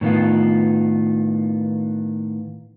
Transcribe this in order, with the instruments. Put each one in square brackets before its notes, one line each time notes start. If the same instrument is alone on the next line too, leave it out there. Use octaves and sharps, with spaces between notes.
[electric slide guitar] A2 D#3 B3 F4